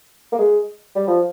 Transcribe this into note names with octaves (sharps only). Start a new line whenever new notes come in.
A#3
G#3
G3
F3